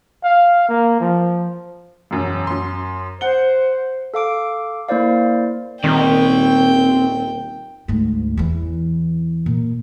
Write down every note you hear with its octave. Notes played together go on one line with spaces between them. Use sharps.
F5
A#3
F3
E1 F#2
F#2 C6
C5 F#5 G7
A4 F5 D6 D7
A#3 E4 C5 D5 F5
D#1 D#3 C4 D5 G5
D2 G#2
E2 E3
A#2